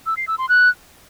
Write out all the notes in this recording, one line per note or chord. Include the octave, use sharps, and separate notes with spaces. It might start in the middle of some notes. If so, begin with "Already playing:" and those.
E6
C7
E6
C6
F#6